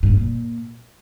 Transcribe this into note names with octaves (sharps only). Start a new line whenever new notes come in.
G2
F2
A#2